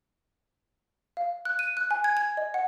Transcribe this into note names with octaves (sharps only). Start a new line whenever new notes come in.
F5
F#6
D#7
F#6
G#5
G#6
G#6
D#5
F#5